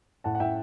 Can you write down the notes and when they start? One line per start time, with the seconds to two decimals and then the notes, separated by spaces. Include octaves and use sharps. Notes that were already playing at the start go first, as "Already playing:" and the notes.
0.24 A2 F#5 A5
0.35 F#5
0.40 A2 E5 G5